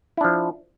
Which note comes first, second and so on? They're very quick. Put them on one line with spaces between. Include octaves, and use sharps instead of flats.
E4 D4 F3